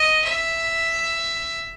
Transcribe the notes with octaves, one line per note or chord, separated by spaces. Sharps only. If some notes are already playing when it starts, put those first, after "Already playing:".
Already playing: D#5
E5